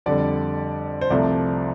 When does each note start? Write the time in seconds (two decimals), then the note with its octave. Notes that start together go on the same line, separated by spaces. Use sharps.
0.06 F2 D3 G3 D5
1.01 C5
1.10 C2 C3 F3 A3 D5